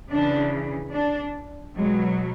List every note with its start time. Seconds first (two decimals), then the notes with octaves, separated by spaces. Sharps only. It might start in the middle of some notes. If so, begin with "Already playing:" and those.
0.11 C#3 E3 D4
0.93 D4
1.76 B2 F#3 G#3